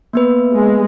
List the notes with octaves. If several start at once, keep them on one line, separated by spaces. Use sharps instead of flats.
A#3 B3 B4
G#3